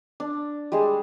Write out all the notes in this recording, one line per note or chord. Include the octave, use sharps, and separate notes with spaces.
D4
G3 G#3 G#4